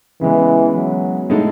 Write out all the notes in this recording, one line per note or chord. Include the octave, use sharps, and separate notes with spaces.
C#3 E3 G#3 B3
F#3
A2 G#3 D#4 A4